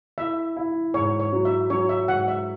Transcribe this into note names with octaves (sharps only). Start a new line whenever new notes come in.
E4 E5
E4
G#2 C#5
C#5
F#3
E5
F#3 C#5
E5
G#2 F#5
E5